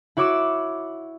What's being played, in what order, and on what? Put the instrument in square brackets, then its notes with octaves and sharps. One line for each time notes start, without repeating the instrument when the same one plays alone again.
[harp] E4 F#4 C#5 D6 E6 E7